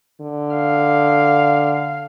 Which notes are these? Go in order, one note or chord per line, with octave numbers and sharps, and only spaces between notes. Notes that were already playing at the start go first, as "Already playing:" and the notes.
D3
F5